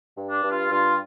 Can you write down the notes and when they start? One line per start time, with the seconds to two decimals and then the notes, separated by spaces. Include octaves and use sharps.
0.17 G2
0.30 D4
0.44 G2
0.51 F4
0.71 G2 F4